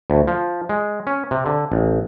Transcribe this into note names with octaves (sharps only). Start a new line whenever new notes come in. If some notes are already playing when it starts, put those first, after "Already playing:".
D2
F3
G#3
C#4
C3
D3
A1